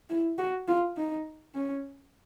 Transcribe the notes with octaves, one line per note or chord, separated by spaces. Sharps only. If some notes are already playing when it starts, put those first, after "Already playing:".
E4
F#4
F4
D#4
C#4